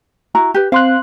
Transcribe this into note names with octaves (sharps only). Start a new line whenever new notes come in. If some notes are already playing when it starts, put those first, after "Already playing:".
E4 F#4 A#5
G4 B4
C4 C5 F5 C6 F#6